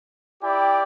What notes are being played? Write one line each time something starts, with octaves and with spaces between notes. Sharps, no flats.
E4 G4 D5 G5